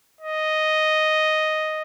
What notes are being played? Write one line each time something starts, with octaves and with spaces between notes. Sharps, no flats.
D#5